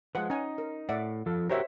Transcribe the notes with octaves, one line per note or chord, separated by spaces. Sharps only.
F3 G#3 B4 F#5
C#4 D#4 G#5
A#4
A2 D5 E5 F#5
F3 A4
F#4 G4 A#4 C5 C#5 E5